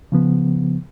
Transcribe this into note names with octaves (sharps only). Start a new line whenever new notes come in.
C#3 F3 B3